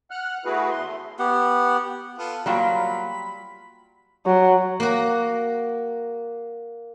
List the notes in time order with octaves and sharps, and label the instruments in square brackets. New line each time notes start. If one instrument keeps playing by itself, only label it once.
[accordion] F#5 F6 F#6
A3 B3 E4 F#4 G#4 B4
E2 C6
A3
[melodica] B3 G4 F#5
[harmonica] B3 F4 A4
[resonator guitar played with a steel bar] F#3 A#3 G5 [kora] G3 F4 F#4 [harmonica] B5
[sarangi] F#3
[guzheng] A#3 F#4